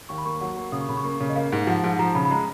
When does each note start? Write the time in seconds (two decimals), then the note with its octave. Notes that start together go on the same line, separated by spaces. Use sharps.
0.09 D#2 C#6
0.18 B5
0.25 A#3 C#6
0.41 F#3
0.57 A#3
0.72 C#3 D#6
0.81 C#6
0.89 C#3 B5
0.97 C#6
1.04 A#3
1.20 C#3
1.29 D#5
1.36 A#3 F5
1.52 G#2
1.67 F3 F#5
1.84 G#2
1.99 F3 A#5
2.15 C#3 B5
2.25 B5
2.31 G#3 A#5